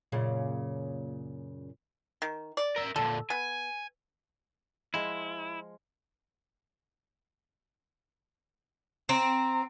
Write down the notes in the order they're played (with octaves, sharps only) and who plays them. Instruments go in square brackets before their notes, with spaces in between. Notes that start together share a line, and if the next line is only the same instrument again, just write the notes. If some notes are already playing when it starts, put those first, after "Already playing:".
[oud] F#2 A#2 C#3
[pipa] D#3
D5
[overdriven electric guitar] A#4 E5
[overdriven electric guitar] A#2 D3 [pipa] A4
[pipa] B3 [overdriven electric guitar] G#5
[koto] F3 G#3 [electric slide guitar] E4
[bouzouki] C4 [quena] A#5